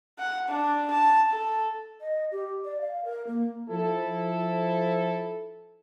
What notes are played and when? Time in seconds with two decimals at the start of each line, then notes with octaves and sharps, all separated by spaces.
0.19 F#5
0.49 D4
0.91 A5
1.30 A4
2.01 D#5
2.31 G4
2.64 D5
2.81 F5
3.05 A#4
3.27 A#3
3.69 F3 E4 A4